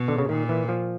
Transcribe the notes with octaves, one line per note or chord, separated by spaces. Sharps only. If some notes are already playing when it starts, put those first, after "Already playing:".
Already playing: B2
D3
C#3
A#2 D#3
E3
F3